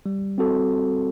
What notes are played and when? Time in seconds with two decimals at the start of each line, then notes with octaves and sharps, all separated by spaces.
0.06 G3
0.38 C4 F#4 A4